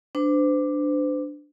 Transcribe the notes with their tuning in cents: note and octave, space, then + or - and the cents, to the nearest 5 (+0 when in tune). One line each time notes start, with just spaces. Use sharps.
D4 +5 C5 -40